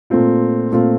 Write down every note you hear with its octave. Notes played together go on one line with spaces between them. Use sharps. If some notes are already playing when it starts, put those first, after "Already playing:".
A#2 A3 C4 F4
A#2 A3 C4 F4